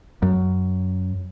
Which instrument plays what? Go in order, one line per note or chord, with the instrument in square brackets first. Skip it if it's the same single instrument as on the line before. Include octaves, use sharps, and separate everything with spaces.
[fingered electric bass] F#2